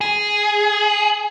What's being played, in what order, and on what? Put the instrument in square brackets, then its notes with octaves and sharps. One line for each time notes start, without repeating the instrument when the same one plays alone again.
[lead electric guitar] G#4